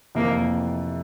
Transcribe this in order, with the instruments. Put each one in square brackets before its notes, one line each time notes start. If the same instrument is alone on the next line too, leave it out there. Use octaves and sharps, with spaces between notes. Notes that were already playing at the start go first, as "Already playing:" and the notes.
[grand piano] F2 C3 E3 A3 [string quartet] A#3